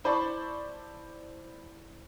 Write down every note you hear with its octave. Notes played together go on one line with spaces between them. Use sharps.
E4 C5 D5 A5 B5 C#6